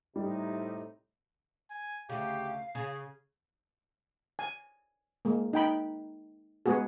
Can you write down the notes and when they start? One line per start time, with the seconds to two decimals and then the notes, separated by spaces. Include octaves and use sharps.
0.16 A2 C3 G3 D#4
1.70 G#5
2.09 D2 C#3 G4 F5
2.75 C#3 G#4
4.39 G#5
5.25 G#3 A#3
5.53 D#4 G5 B5
6.66 G#3 B3 F#4 G#4